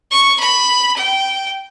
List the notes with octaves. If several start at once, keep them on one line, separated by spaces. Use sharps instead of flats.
C#6
B5
G5